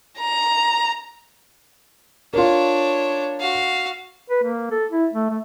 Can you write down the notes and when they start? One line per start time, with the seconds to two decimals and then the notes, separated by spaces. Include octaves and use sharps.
0.18 A#5
2.34 D4 F4 A#4 C#5
3.40 F#4 F5
4.30 B4
4.44 A#3
4.71 A4
4.91 E4
5.14 A3
5.30 A3